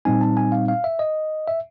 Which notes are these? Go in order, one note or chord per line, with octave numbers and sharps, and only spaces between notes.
A#2 G3 C4 D#4 G#5
A5
G#5
F5
F5
E5
D#5
E5